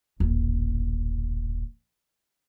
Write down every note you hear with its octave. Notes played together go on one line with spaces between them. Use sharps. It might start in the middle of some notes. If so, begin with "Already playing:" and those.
D#1 A1